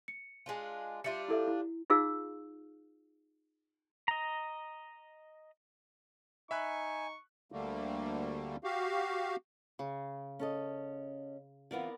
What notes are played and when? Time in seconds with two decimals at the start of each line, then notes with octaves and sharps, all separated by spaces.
0.08 C#7
0.46 G#3 D4 F4
1.04 G3 D4 F4 E5 C#7
1.28 E4 A4 E5
1.47 E4
1.90 D#4 F4 G#4 F5 E6
4.08 D#5 A#5
6.51 D#4 E5 G#5 B5 C#6 F#6
7.52 D2 D3 G3 A3 A#3
8.64 F#4 G4 F5
9.79 C#3
10.39 C#4 A4 D#5
11.71 E3 B3 C4 F4 A#4 D5